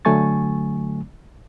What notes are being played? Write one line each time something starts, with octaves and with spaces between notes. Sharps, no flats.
D3 F#3 A3 G#5 C#6 A6